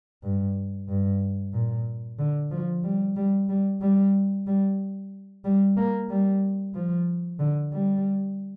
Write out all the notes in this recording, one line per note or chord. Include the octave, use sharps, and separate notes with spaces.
G2
G2
A#2
D3
F3
G3
G3
G3
G3
G3
G3
A#3
G3
F3
D3
G3